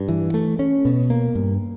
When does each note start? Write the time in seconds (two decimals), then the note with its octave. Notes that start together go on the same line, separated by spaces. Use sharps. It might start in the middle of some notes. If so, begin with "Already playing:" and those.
Already playing: G2
0.08 E3
0.34 A3
0.59 C#4
0.85 B2
1.10 A#3
1.35 G2